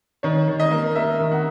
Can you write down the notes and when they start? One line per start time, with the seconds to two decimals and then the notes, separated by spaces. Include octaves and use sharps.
0.23 D#3 C#5
0.48 D#3
0.60 D#5
0.71 A#3
0.95 A#3 E5
1.20 D#3
1.32 F#5